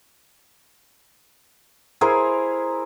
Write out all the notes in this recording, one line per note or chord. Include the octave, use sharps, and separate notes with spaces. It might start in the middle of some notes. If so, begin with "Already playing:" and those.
E4 G#4 A#4 C5